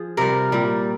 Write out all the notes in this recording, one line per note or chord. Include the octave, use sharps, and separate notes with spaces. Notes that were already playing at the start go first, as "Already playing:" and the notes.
Already playing: F3 G#4
C3 G3 A#4
A#2 G3